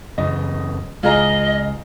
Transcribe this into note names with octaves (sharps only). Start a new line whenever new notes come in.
F#2 C#3 E3 D#5
C#2 G#3 F4 G#4 D#5 A#5